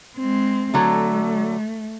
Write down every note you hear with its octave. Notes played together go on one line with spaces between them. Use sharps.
G#3 C4
D3 F#3 A3 A4